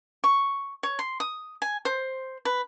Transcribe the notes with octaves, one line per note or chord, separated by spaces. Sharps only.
C#6
C#5
C6
D#6
G#5
C5
B4